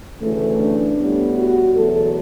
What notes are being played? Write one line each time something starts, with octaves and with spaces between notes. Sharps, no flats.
D2 C#3 E3 A3
D4
A2 G3 B3
F#4
E2 B2 F#3 A3 A4